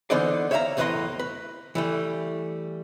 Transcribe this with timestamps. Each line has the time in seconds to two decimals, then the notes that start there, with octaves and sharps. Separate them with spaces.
0.10 D3 E3 B3 D#4 C5 D5
0.51 C#5 E5 F5 G5 A#5
0.77 B1 E2 A2 B4 D#5 C6
1.19 B4
1.75 E3 G3 A3